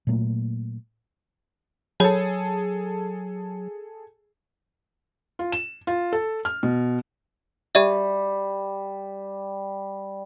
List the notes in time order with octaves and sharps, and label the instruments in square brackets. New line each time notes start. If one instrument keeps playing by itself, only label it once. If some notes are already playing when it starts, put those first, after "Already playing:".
[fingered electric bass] A#2 F#3 A3 A#3
[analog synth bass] F#3 [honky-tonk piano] G#4 A4 [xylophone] C#5 B5
[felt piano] F4
E7
F4
A4
F6
B2
[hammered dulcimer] G3 [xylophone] G4 D5 E5